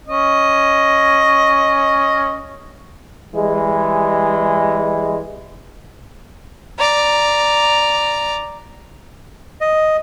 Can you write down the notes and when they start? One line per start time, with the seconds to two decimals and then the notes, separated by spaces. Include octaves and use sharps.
0.07 C#4 D#5
3.35 E3 G3 G#3
6.78 D5 A#5
9.61 D#5